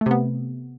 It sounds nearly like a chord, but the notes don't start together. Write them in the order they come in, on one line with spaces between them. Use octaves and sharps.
A3 C3 B3